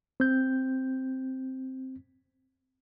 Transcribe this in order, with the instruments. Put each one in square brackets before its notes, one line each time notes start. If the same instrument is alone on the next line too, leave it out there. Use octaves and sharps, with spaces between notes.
[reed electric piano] C4 G6